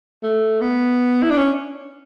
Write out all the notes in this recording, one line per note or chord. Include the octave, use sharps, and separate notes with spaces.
A3
B3
E4
D4
C#4